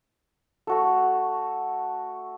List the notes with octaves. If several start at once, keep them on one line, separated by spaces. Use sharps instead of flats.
A3 F#4 A4